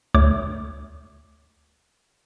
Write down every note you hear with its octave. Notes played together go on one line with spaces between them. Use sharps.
D2 A3 D4 C#5 D6